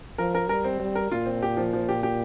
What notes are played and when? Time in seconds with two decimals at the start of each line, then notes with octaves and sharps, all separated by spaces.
0.18 F3 A#4
0.35 A#4
0.49 G3 A#4
0.64 C4
0.80 G3 C4
0.95 A#4
1.11 A#2 F4
1.26 C4
1.43 G4
1.57 F3
1.73 F3
1.89 G4
2.03 G4